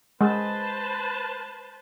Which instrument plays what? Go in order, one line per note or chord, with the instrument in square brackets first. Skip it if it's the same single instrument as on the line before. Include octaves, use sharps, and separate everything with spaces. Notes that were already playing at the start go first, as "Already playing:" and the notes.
[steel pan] G#3 [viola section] B4 C5 A5